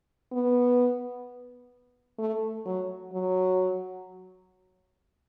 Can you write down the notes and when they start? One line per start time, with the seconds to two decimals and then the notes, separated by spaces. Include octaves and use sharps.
0.32 B3
2.19 A3
2.66 F#3
3.13 F#3